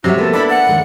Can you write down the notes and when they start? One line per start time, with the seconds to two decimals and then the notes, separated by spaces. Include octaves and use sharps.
0.04 C3 F#3 G3 F#4 C5 E5
0.18 A#3 B3 A4 B4
0.33 D4 E4 B5
0.49 F#5
0.67 D#2 G#3 A#4